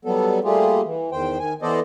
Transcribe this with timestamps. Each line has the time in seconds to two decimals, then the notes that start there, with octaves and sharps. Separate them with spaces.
0.05 F#3 G3 B3 A4
0.44 G3 A3 A#3 F4 G4 G#4
0.85 E3
1.12 E2 D#3 C5 G5
1.39 D#3 G#5
1.62 E3 B3 A4 C5 D5 D#5